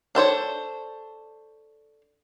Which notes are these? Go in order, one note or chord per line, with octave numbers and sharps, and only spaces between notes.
D4 A4 C5 C#5